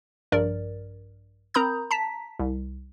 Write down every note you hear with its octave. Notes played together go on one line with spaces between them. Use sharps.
A#1 G2 A#4 D5
C4 A#4 A#5 B5 D#6 G6
A5 A#5 B6
C2